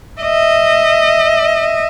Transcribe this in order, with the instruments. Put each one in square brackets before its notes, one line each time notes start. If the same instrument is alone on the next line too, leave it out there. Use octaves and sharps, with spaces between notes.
[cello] D#5 E5